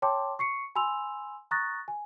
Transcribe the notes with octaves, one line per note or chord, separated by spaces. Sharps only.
C#5 G5 A5 C6 D6
C#6 C7 C#7
G#5 B5 C6 E6 F7
A#5 C#6 D#6 F#6 A6 A#6
G#5